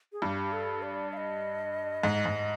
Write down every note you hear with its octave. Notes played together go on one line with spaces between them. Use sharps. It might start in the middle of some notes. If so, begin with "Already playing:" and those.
G#4
G2 G4
A4
D5
F5
D#5
G#2
G#2